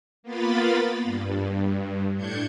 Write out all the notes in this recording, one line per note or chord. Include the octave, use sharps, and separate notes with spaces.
A#3 B3 F4 B5 A6
G2
A2 D4 G6 G#6 C#7